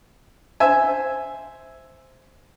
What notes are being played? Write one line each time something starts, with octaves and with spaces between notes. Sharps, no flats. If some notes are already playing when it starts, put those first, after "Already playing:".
C5 E5 G#5